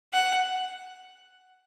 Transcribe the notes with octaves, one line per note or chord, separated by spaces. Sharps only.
F#5